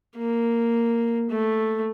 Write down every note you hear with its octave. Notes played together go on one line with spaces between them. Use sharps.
A#3
A3